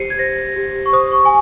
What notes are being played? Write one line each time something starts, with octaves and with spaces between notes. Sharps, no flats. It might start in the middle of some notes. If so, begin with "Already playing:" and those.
Already playing: G4 C5 C7 C#7 D#7
G#6
C5 A#6
G4
C#6
C5 D#6
C#6
G#5